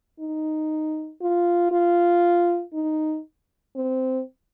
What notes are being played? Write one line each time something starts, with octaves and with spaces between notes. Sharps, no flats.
D#4
F4
F4
D#4
C4